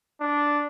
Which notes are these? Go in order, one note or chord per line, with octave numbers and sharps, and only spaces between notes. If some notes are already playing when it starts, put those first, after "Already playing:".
D4